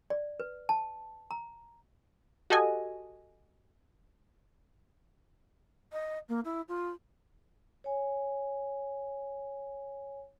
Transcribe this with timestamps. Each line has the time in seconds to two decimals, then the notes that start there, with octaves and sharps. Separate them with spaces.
0.10 D5
0.40 B4
0.69 A5
1.31 A#5
2.50 F#4 G4 A4 D#5 G#5
5.93 D#5
6.29 A#3
6.45 E4
6.68 F4
7.84 C#5 G#5